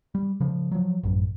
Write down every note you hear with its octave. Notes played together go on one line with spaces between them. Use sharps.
G3
C#3 F3
F3 F#3
A1 F#2